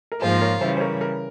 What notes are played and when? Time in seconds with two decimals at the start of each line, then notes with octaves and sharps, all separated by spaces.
0.12 A#4
0.21 G#2 F3 A#3 F4 G#4 C5
0.41 A#4 C#5
0.61 C#3 E3 G3 C5 E5
0.77 C5
0.81 A#4 C#5
1.01 A#4